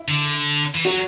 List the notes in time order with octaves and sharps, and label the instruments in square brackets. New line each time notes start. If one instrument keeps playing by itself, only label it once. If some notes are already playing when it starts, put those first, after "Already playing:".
Already playing: [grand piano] E4
[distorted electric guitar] D3
E3
[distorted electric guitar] F#3 [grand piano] F#4